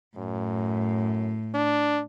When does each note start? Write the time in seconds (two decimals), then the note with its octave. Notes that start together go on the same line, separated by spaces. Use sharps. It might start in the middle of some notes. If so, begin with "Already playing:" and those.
0.17 F#2 A2
1.54 D4